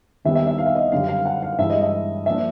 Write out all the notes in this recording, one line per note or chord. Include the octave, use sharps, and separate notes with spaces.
D#2 D#3 G3 B3 D#4 E5
E5
E5
F5
E5
D#5
F#2 D3 G3 F5
F5
F#5
F5
G2 E3 G#3 E5
D#5
E5
F3 A#3 D4 E5